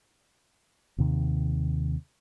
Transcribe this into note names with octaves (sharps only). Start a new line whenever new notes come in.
D#2 C3 D#3